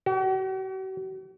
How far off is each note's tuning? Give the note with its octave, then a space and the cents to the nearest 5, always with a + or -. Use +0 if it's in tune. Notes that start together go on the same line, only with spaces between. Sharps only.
F#4 +45